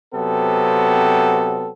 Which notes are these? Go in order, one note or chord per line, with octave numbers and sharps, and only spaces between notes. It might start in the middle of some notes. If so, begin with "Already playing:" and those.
C3 F#3 B3 C4 A4